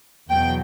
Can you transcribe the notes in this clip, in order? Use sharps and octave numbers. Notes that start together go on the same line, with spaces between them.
E2 B2 F#3 G5